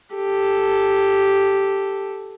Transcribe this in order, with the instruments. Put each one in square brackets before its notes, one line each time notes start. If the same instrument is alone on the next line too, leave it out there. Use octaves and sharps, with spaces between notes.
[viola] G4 A4